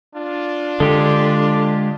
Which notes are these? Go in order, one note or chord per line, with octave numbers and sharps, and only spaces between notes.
D4 F4
D3 G#3 G4 A4